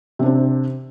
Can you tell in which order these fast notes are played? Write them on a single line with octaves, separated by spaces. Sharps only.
C3 D4 C4